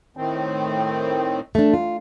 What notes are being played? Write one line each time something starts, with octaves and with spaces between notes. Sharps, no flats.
A2 D#3 C4
A3 D4
F4